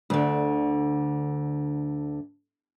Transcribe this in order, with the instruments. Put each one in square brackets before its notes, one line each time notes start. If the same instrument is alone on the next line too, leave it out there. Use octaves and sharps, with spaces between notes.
[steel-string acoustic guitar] D2 D3